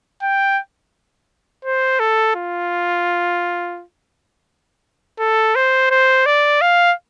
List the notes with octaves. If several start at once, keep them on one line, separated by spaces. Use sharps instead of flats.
G5
C5
A4
F4
A4
C5
C5
D5
F5